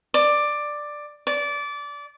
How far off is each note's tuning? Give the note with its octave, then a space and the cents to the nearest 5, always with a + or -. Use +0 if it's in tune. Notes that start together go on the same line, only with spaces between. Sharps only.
D5 +10
D5 -20